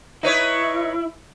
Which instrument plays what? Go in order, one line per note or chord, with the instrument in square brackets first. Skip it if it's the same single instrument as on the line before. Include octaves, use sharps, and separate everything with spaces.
[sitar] D#4 B4 C#5 [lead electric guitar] E4